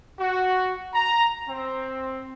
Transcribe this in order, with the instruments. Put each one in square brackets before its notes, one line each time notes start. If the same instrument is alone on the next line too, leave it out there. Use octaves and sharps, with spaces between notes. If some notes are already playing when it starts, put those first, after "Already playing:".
[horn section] F#4
A#5
C4